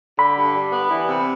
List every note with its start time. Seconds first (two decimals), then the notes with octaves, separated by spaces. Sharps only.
0.18 D3 B5
0.37 G2
0.55 G3
0.73 B3
0.90 E3
1.08 C3